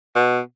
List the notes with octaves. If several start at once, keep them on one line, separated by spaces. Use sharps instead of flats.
B2